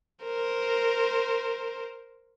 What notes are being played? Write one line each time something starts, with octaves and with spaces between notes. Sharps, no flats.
A#4 C5